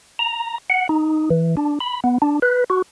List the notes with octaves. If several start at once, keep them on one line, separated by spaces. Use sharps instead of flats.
A#5
F#5
D#4
E3
D4
B5
B3
D4
B4
F#4